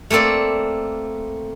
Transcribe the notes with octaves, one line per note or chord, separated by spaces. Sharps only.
A3 A#3 C4 A4 D5